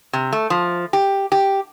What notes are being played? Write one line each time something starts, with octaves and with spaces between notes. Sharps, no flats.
C3
A3
F3
G4
G4